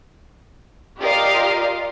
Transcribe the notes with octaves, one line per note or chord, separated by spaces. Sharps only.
F4 G4 A#4 D5 D#5 F5